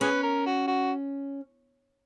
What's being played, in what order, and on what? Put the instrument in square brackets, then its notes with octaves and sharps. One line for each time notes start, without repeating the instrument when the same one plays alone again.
[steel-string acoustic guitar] C#4 [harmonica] G#4 B4
[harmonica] A#4
F#4
F#4